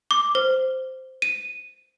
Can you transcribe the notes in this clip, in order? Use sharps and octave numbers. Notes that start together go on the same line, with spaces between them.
D6
C5
D#7